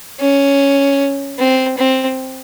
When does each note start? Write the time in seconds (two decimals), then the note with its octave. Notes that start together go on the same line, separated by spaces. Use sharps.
0.20 C#4
1.39 C4
1.77 C4